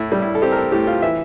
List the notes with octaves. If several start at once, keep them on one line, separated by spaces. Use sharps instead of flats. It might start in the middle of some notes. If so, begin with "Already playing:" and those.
Already playing: A2 E4
G3
E4
A4
C4 G4
A#4
A4
A2 G4
F4
E3 E5